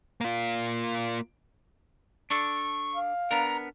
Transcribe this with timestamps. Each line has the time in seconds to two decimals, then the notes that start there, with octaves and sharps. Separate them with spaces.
0.21 A#3 F4
2.30 D4 A4 C#6
2.96 F5
3.31 B3 D4 A#4 A#5